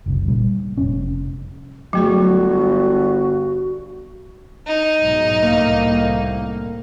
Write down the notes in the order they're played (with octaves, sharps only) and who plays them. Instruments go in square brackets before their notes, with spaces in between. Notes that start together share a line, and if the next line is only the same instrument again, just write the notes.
[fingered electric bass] F#1 C2
A#2 G3
F1 C#4
[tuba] G1 [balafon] F#3 A3 G#4 [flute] F#4
[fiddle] D#4
[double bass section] B1 G#2
C2 A2 A#3